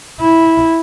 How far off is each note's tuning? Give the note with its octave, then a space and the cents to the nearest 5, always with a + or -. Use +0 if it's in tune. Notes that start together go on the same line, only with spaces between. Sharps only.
E4 -10